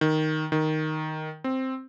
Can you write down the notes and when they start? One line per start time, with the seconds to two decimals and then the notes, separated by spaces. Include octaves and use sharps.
0.01 D#3
0.52 D#3
1.44 C4